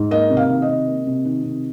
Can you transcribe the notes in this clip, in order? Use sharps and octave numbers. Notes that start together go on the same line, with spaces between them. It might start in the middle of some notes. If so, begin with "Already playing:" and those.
Already playing: G#2
A#3 D#5
C3
F5
D#3
D#5
C3
A#3
C3
D#3
C3